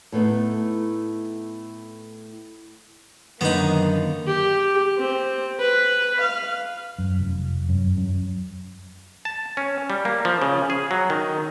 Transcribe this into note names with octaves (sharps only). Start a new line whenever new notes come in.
A2 A3 B3 D#4
F#2 D3 D#3 A#3 B3 D#4
G4
C4
B4
F5
F#2
F1
F#2
F#2
A5
C#4
G3
A#3
F3
C#3
G#4
F#3
D#3